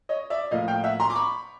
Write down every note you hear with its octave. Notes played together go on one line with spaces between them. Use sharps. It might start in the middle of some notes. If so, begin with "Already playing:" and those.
C#5 D#5
D5 E5
A2 F3 A#3 D#5 F5
F5 G5
E5 F#5
A#5 C6
D6
B5 C#6